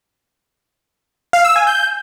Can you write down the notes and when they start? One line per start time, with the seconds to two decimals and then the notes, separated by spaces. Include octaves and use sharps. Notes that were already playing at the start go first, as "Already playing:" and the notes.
1.33 F5
1.44 E6
1.56 G#5
1.67 G6